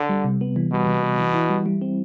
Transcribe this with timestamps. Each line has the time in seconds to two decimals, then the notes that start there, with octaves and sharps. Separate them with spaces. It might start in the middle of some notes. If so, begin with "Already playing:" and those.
Already playing: D3
0.09 G3
0.24 C3
0.41 B3
0.56 E3
0.71 B2 G3
0.87 C3
1.03 B3
1.19 E3
1.34 E4
1.50 G3
1.66 G3
1.81 C4